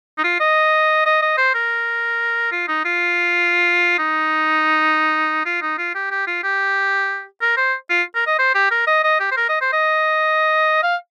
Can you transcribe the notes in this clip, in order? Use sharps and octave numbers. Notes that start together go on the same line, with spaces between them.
D#4
F4
D#5
D#5
D#5
C5
A#4
F4
D#4
F4
D#4
F4
D#4
F4
G4
G4
F4
G4
A#4
C5
F4
A#4
D#5
C5
G4
A#4
D#5
D#5
G4
C5
A#4
D#5
C5
D#5
F5